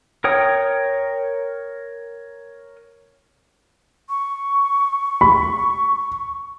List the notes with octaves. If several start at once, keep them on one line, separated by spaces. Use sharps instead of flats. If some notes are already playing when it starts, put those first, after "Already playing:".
A#4 C#5 G5 D#6
C#6
B5